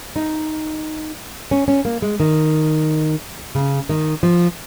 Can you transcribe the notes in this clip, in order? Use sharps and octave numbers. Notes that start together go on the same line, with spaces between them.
D#4
C#4
C#4
A#3
G#3
D#3
C#3
D#3
F3